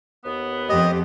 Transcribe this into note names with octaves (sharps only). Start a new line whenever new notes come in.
D#2 B3
F2 G4 D#5